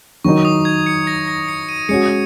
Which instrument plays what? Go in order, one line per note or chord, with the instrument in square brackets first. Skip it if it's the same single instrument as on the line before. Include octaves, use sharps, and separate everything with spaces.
[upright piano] D#3 F#3 D#4 [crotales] C#6
[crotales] D#6
G#6
C#7
A#6
A#6
C#7
D#7
[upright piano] G#3 C#4 F#4 [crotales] C#7